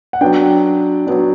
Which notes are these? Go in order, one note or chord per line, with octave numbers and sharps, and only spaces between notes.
F#5
F#3 B3 D4 G5
F#3 B3 D4